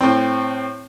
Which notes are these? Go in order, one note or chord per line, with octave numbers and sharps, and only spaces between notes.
A2 C4